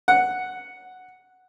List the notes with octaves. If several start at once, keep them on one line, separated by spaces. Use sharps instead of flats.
F#5